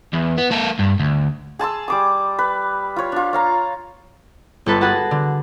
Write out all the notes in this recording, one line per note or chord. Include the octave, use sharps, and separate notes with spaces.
E2
B3
A#3 A4
G2
D2
G#4 A5 C6 E6
G3 D6 D#6
B4
F4 C#5
D4 F4
C#5 F5 A#5
G1 A4 B4 A5
F#4 G#4 B4 F#5 A5
D3